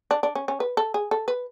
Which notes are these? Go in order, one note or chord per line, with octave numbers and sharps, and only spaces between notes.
D4
D4
C#4
C#4
B4
A4
G#4
A4
B4